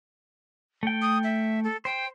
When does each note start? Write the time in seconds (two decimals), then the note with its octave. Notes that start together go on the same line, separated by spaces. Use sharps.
0.83 A3 G5
1.02 D#6
1.24 E5
1.64 A4
1.85 C5 G5